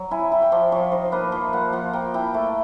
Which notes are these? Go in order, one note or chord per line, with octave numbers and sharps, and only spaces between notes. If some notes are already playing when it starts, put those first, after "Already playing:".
Already playing: F#3
E4 G#5
E4 G5
G5
F3 D5
F3 C#5
D#4 C5
A#3 B4
F3 E5
A#3 F#5
F3 F#5
A#3 G5
E4 G5
A3